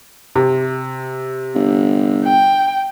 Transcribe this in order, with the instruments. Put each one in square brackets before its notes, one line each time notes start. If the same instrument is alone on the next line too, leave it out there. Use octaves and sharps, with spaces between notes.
[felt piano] C3
[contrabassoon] G1
[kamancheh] G5